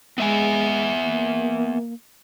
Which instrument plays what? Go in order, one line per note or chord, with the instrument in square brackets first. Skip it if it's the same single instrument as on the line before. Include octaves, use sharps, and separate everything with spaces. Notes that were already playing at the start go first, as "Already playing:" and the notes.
[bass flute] G#3 [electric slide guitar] B3 E5 G#5
[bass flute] A#3